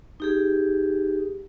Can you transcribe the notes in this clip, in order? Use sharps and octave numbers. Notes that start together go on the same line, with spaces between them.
D#4 G4 G#4